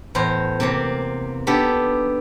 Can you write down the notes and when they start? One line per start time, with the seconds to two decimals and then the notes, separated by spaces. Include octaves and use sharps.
0.15 E2 A2 C5 A#5
0.60 C3 A#3 C4
1.47 B3 D4 D#4 G4 A4